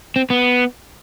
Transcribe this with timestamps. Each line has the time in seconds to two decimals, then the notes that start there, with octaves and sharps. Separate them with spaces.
0.16 C4
0.30 B3